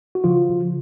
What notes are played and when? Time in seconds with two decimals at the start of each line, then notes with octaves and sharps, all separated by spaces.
0.15 F#4
0.24 C#3 F3 F4
0.50 C#3